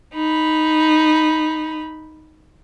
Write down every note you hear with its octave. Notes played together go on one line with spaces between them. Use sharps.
D#4 B5